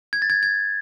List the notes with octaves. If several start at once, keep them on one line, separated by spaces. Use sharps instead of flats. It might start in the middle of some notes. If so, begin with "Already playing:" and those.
G#6
A6
G#6
G#6